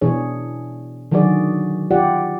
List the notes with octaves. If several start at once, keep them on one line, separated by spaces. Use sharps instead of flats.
B2 E3 D4 G#4 C#5
D3 D#3 F#3 F#4 G#4 D5
F4 G4 D5 F#5